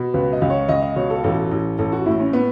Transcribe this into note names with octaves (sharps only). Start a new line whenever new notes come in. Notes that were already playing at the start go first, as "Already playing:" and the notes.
Already playing: B2
C#2 B4
D#5
C#2
C#5
C#2 D#5
D#5
B2 C#5
A4
A1 A4
A1
A1 A4
F#4
A2 E4
C#4
B3